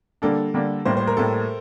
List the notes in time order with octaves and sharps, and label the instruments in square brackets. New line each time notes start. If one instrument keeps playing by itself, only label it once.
[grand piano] D3 G3 A#3 D4 [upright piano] A4
[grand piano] D3 G3 A#3 D4
[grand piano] A2 G3 A#3 [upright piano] C5
[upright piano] C5
A#4
[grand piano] A2 G3 A#3 [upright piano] A4